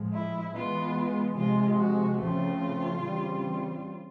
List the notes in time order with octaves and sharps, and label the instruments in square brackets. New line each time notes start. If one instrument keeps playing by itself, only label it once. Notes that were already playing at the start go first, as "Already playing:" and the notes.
Already playing: [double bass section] A2 F3 G#3
[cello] E4
[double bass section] E3 G#3 B3 [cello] F4
[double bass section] C3 F3 G#3 [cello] F4
[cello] F#4
[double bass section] C#3 F3 A3 C4 [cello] F4
[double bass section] C#3 E3 G3 C4